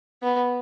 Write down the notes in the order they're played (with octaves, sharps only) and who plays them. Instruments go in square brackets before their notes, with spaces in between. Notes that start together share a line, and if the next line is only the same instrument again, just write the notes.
[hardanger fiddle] B3